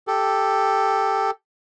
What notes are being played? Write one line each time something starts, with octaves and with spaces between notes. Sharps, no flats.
G4 A4